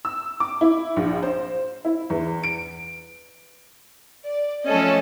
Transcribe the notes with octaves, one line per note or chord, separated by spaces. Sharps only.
E6
D6
E4
A#1
C5
E4
E2
D7
D5
F3 A3 C#4 A4 D#5